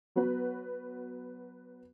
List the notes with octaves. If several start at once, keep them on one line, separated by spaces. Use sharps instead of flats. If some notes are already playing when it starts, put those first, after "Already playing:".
F#3 B3 F#4 B4